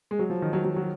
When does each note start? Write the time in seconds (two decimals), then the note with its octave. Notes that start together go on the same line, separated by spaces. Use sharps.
0.11 G#3
0.19 F#3
0.30 F3
0.42 D#3
0.53 F#3
0.64 F#3
0.76 F#3